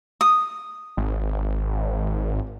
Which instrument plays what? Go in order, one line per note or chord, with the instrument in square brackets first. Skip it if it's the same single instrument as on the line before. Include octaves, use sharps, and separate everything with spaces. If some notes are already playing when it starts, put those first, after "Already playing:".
[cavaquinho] D#6
[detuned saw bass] G#1